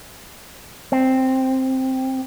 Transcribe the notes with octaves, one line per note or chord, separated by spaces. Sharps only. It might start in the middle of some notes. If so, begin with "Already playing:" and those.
C4